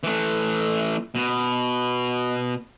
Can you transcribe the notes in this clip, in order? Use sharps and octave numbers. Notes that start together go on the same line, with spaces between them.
E3 A3
B2